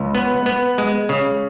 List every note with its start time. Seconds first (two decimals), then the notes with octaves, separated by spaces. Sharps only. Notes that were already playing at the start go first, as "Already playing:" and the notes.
Already playing: C#2
0.15 B3
0.46 B3
0.78 G#3
1.09 C#3